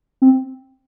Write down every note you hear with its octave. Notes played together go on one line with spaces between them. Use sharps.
C4